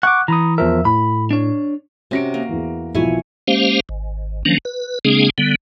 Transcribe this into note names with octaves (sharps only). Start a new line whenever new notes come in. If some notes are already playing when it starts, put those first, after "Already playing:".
F#5 C#6 D6
E3 A#5 B5 D#6
E2 F3 A#4 E5
A2 B5
D4 C#5
C3 C#4 F#4 A#4 A#6 D7
A#3
E2 E3
B1 E3 F3 E4 C#5 G#5
G#3 A#3 C#4 G4 C5 F5
G#1
D#3 F3 F#3 A#3 C#4 D4
B4
C#3 G#3 A#3 C4 D4 G#4
D3 G3 B3